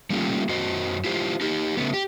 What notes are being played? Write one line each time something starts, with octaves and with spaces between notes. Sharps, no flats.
G3 A3 A#3 C#4 F4 G4
F#2 F#3 F#4 C5 D#5
E4 F4 G4 C5
D#4 G4
C#3 A3 B3
G4